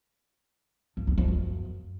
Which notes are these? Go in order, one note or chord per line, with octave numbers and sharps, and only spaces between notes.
G2
E2
F2
F#2